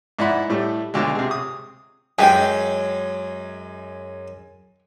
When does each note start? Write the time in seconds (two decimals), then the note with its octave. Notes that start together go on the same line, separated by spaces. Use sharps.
0.19 G#2 E4 D5 F#5 B5
0.49 A2 G3 A3
0.94 D2 B2 D3 F#3 G#3
1.15 C3 G#4
1.31 D#6
2.18 F#2 G#3 G4 G#4 B4 D#5 G5